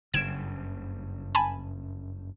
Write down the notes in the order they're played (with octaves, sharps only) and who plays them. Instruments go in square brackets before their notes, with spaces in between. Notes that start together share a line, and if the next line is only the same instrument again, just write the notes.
[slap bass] F#1 G2 C#3 [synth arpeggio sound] G#6 D7 E7
[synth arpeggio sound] G#5 A5 B5